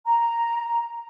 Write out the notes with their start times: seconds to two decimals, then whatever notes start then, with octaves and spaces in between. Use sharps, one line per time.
0.06 A#5